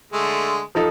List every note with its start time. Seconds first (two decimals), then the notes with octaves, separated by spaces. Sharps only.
0.13 D3 G#3 A3
0.75 F3 D#4 A4